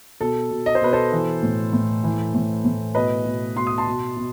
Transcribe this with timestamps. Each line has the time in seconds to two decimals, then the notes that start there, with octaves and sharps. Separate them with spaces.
0.21 B2 A4
0.51 B2
0.66 D#5
0.75 C5
0.82 B2 B4
0.93 A4 C5
1.12 E3
1.43 A2
1.73 A2
2.04 E3
2.34 A2
2.65 A2
2.95 B2 B4 D#5
3.25 B2
3.56 B2 C6
3.67 D#6
3.78 A5 C6
3.87 B2
4.17 B2